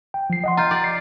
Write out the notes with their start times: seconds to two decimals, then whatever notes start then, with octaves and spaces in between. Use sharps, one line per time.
0.14 G5
0.30 F3 C7
0.44 D#5 F#5 C6
0.57 F4 A#5 G6
0.71 G4 D5
0.84 C7